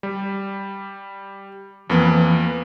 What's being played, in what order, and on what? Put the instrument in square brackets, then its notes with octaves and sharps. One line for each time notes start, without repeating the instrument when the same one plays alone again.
[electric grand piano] G3
[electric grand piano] F2 A#3 B3 [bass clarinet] E3